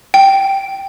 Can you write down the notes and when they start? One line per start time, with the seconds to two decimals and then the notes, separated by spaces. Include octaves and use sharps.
0.14 G5